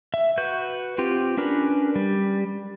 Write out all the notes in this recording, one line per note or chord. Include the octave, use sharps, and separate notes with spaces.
E5
F#4 B4 G6
C4 F4 G4
C#4 D4 A#4 B4
G3